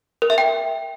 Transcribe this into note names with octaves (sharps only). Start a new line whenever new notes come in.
A#4
E5
G5